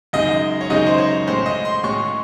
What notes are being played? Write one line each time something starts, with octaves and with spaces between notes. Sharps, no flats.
F#2 C#3 G#3 D#4 D#5
C#5
F#2 C#3 G#3 D#4 D#5
C5
C#5
A2 G#3 C#4 C5
D#5
C6
A2 G#3 C#4 C#6